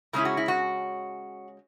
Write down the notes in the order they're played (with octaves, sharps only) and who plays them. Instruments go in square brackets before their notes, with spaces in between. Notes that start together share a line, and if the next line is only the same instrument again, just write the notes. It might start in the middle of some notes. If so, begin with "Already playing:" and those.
[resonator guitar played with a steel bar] C#3 G#3 C#4 E4 G#4
F#4
E4
F#4